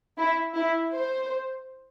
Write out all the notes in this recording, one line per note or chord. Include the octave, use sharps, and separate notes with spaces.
E4
E4
C5